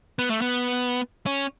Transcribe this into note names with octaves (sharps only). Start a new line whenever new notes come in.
B3
A3
B3
C#4